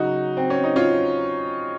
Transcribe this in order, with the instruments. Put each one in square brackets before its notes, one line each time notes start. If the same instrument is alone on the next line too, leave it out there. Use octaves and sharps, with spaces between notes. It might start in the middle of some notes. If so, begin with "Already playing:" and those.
Already playing: [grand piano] C#3 F#3 D#4 F#4
C4
C#4
D#4
C#4 F4